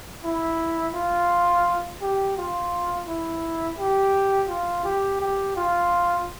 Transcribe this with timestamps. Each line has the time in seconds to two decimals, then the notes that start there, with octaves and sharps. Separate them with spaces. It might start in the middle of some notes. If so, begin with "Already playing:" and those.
0.24 E4
0.95 F4
2.01 G4
2.37 F4
3.08 E4
3.79 G4
4.49 F4
4.84 G4
5.21 G4
5.56 F4